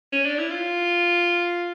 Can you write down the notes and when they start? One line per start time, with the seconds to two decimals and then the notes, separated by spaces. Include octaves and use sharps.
0.12 C#4
0.25 D4
0.38 E4
0.50 F4